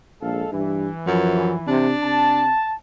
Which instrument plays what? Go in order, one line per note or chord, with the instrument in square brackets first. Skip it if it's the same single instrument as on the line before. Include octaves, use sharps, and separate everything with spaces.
[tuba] A#1 [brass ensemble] G#3 A4 F5
[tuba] G2 [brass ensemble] E3
[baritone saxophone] F#2 [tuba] F3
[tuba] C3 [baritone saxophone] D4
[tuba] C3 [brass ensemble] A5